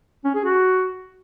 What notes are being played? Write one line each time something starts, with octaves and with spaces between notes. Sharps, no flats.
C#4
G#4
F#4